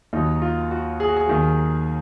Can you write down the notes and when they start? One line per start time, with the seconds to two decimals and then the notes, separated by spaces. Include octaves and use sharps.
0.13 D#2 D#3 F#3 D#4
0.42 F4
0.71 F#4
1.00 G#4
1.09 F#4
1.17 G#4
1.28 D#2 D#3 F#3